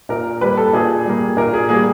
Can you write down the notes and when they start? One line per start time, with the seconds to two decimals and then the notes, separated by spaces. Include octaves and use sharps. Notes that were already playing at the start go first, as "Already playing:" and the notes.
0.09 A#2 A#4
0.41 G3 A#3 B4
0.57 A4
0.73 A#2 G#4
1.05 G3 A#3
1.37 A#2 A#4
1.54 G#4
1.69 G3 A#3 G#4